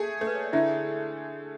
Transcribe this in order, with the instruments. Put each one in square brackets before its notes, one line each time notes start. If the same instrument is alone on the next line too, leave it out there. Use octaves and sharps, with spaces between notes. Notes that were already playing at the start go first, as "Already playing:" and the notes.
Already playing: [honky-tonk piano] A3 G#4
A3
[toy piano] B4
C#5
D5
[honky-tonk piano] D3 [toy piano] E4 E5